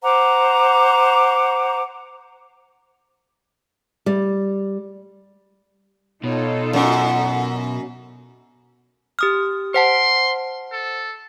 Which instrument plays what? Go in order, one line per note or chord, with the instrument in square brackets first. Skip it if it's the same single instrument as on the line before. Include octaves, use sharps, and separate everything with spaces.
[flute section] C5 F#5 A#5 D6
[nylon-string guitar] G3
[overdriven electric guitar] B2 [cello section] D#4 F4 A4 [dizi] C#5
[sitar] F#2 [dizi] F#5
[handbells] G4 D#6 F6
[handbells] C5 F#5 A5 [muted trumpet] C6
[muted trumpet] A4